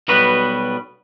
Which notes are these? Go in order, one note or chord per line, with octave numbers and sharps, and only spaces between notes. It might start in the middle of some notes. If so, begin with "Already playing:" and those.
B1 G3 B3 F#4 B4